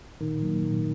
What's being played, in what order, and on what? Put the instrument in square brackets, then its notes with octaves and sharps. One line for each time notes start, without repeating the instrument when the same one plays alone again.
[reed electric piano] A#2 [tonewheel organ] D#3
[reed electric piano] F#3 A#3
A#2